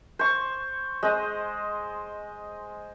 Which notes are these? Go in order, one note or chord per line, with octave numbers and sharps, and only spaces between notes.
C5 C#6
G#3 C5 D#5